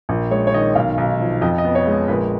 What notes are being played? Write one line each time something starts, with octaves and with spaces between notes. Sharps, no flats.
A#1
G#3 C#5
C#5
D#3 D#5
B1 F5
B1
F3
F2 D#5
D#5
B3
C#5
G#3
A#1 B4